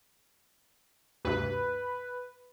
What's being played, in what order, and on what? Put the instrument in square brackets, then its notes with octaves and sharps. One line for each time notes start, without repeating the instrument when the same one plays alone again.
[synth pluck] D2 G2 C3 [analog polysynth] B4